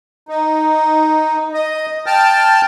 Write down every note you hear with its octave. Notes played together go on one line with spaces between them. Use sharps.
D#4
D#5
G5 A5 F6